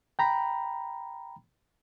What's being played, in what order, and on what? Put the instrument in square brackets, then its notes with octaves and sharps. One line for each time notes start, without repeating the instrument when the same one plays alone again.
[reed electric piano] G5 A#5 B5